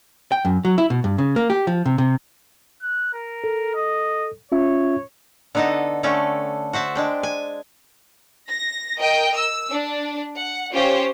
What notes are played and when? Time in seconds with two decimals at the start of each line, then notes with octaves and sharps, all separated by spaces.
0.32 G5
0.45 F#2
0.65 F#3
0.78 E4
0.90 B2
1.04 G2
1.18 C#3
1.36 A#3
1.50 G4
1.67 F3
1.86 C3
1.98 C3
2.82 F#6
3.13 A#4
3.44 A4
3.75 D#5
4.52 C#4 F4 C#5 E5
5.55 D3 B3 D#4 A4 D#5 A5
6.03 D3 A3 C#4 A4 G5
6.73 F#4 C5 E5 A5
6.95 G#3 D4 G5
7.23 G#5
8.49 A#6
8.98 A#4 D#5 G5
9.36 E6
9.70 D4
10.37 F#5
10.72 C#4 F4 G4 C5 C#5